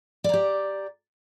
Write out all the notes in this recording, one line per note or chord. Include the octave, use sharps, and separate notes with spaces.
G4 D5 A#5